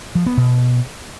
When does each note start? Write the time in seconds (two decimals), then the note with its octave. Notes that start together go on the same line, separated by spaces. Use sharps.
0.15 F3
0.26 B3
0.37 B2